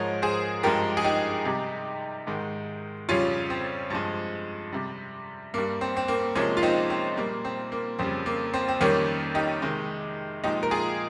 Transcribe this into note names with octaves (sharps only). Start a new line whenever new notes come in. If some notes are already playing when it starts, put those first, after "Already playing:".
Already playing: G#2 F3 G#3 A#4 C#5
G#4 C5
G2 F3 G#3 G4 A#4
G#4
D#4 G4
C3 G3
G#2 D#3 G#3
F2 C#3 G3 C#4 F4
C4
G2 F3 G#3
C3 G3
G2 G3 A#3
C4
C4
A#3
C3 F3 G#3 A#3 C#4
F4
C4 D#4
C4
A#2 G3 A#3
C4
A#3
F2 C#3 G3 C4
A#3
C4
C4
F2 D#3 G3 A#3 C#4
D#4 G4
C3 D#3 G#3
A#2 F3 G#3 D#4 G4
A#4
F4 G#4